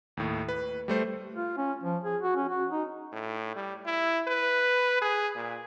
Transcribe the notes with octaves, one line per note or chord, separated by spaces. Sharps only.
D#2 A2
B4
G3 A3 C5
F4
C#4
F3
G#4
F#4
C#4
F#4
D#4
A2
G3
E4
B4
G#4
A#2